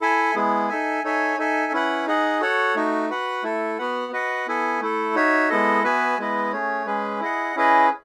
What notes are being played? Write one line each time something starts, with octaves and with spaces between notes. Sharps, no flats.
E4 A4 E5 G#5
G#3 B3 E4 G#4
D#4 A4 E5 G#5
D#4 A4 C#5 E5 G#5
D#4 A4 E5 G#5
C#4 E4 B4 F#5
D#4 G#4 D#5 F#5
F#4 A4 C#5 F#5
A3 D#4 F#4
F#4 B4 F#5
A3 E4 A4
B3 F#4 B4 F#5
F#4 B4 D#5 F#5
B3 E4 A4 E5 G#5
A3 E4 A4
D#4 F#4 C#5 E5
G#3 B3 E4 A4 D#5
B3 F#4 B4 E5 G#5
G#3 B3 E4 B4 D#5
A3 C#4 G#4 C#5
G#3 C#4 G#4 B4
E4 G#4 D#5 F#5
C#4 E4 G#4 B4 D#5